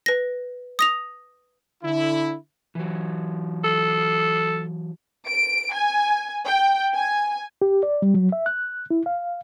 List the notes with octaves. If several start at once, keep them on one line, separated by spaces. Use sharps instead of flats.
B4 A#6
D#6 A#6 F7
D3 E4
E3 F#3
A4
D7
G#5
G5
G#5
G4
D5
G3
F#3
E5
F#6
E4
F5